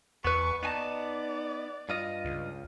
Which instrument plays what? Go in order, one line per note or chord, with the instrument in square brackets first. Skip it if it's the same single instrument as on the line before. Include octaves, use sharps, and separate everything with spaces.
[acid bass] E2 [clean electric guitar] B3 B4 [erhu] C#6
[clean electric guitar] B3 G#5 A5 [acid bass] D#4 [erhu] D5
[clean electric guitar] G2 F4 D#5
[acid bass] C#2